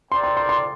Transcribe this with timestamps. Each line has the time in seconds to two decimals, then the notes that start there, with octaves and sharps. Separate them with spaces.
0.11 C4 G4 A#4 D5 G5 C6
0.24 C6
0.37 C6
0.49 C6